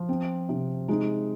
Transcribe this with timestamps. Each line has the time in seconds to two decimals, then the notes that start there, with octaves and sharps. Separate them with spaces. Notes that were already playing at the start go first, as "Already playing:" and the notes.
Already playing: F3
0.09 C4
0.49 C3
0.88 G#3 D#4